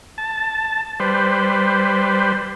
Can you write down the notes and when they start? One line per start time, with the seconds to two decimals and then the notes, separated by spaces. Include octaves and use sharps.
0.18 A5
1.00 G3 B4 C5